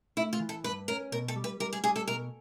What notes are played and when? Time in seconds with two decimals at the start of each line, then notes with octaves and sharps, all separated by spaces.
0.17 A3 E4
0.33 F4
0.40 E3
0.49 A4
0.64 G2 B4
0.88 C#4 A#4
1.12 B2 A#4
1.28 A4
1.36 G3
1.44 B4
1.60 G3 A#4
1.73 G#4
1.84 G3 G#4
1.96 A4
2.08 B2 A#4